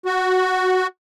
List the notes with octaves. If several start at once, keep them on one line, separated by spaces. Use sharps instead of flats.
F#4